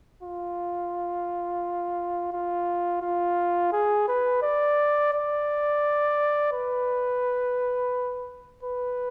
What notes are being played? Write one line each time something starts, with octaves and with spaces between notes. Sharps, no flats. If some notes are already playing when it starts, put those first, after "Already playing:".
F4
F4
F4
G#4
B4
D5
D5
B4
B4